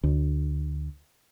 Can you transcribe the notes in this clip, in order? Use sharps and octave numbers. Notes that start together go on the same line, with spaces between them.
D2